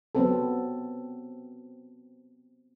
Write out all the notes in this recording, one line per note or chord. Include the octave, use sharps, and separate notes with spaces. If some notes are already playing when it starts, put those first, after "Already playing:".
F#3 B3 C4 A4